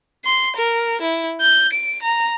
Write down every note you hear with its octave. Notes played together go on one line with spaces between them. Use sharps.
C6
A#4
E4
G6
D7
A#5